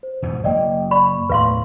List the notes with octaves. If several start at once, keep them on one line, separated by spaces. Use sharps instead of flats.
C5
E2 G#2 B2
F#1 F#3 A#3 D5 D#5 G5
D5 B5 C#6
D#2 A2 B4 F5 C6